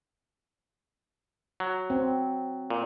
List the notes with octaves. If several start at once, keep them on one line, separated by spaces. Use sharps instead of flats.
F#3
C4
A#2